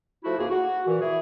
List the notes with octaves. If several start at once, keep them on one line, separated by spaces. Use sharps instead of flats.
F3 A3 E4 F#4
C#2 G#2 A#3 G#4
F#4
A#2 E3
E4 G#4